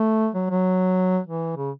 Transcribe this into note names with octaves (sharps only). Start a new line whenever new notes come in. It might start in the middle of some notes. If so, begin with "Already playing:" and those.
Already playing: A3
F#3
F#3
E3
C#3